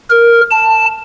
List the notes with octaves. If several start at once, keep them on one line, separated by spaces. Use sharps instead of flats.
A#4
A5